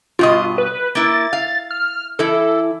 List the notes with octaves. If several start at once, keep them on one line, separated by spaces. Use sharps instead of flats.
G2 B2 F4 D#5
B4
A#3 E4 A6
F5
F6
E3 E4 A4